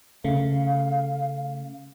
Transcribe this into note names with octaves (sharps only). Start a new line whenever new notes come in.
C#3 A3 F5